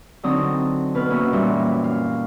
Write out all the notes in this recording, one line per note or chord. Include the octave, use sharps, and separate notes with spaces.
D3 F#3 C4 D#4 D#6
B2 B4 F6
A#3 C#4 E4 F#4
F#2 A#2 E3 G3
F5